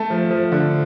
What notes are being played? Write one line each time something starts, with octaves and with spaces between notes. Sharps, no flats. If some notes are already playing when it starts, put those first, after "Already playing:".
Already playing: A3 A5
F3
F3
D3